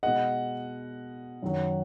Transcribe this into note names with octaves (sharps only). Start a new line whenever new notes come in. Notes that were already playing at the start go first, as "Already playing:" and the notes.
B2 G#3 D#5 F#5
F#2 D#3 F#3